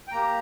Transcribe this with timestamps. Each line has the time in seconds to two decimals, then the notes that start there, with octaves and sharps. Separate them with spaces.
0.08 G5
0.12 A#3 G4 A#5